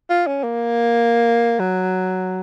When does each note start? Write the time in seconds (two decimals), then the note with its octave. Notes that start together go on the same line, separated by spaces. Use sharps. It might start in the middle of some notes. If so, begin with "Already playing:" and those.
0.10 F4
0.27 C#4
0.44 A#3
1.59 F#3